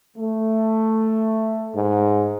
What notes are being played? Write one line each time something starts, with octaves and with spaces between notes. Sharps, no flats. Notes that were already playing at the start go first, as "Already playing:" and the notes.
A3
G#2